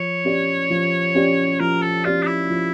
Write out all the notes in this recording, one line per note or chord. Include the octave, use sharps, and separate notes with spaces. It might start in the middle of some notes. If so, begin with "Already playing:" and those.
Already playing: F3 C#5
C#4 G4 D5
F3
C#4 G4 D5
F3 A#4
A4
C#4 F4 G4 D5
D4
E4
F3